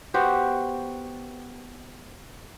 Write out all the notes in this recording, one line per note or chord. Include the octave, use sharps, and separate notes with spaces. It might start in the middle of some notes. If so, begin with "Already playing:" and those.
B3 F#4 G4 C5